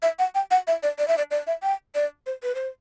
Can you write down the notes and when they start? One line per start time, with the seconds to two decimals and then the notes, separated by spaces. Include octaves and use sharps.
0.03 E5
0.19 F#5
0.35 G5
0.51 F#5
0.67 E5
0.83 D5
0.99 D5
1.08 E5
1.18 D5
1.31 D5
1.47 E5
1.63 G5
1.95 D5
2.27 C5
2.43 B4
2.55 C5